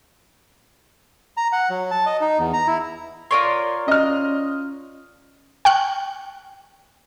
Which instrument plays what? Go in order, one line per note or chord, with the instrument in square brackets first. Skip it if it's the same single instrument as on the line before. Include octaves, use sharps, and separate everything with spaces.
[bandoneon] A#5
F#5
F#3
A5
D#5
D#4
E2
A#5
E4
[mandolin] F4 A#4 C#5 [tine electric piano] D5 C6
[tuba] C#4 [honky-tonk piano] D#5 F6
[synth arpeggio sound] G5 C#6 F6 F#6